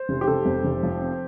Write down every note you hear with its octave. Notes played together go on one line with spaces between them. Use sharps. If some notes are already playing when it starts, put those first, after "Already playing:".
Already playing: C5
F1
G4
F1 A4
F2
F1
F3
C4